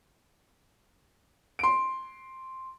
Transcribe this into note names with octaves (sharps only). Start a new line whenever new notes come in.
C6 D7